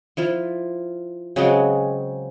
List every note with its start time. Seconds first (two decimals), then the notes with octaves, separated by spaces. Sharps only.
0.17 F3 E4 F4
1.36 C#3 F#3 G#3 C4